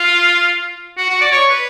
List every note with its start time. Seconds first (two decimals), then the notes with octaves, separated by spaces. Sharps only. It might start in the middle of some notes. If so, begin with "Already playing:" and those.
Already playing: F4
0.98 F#4
1.09 F#4
1.21 D5
1.32 C#5
1.50 B4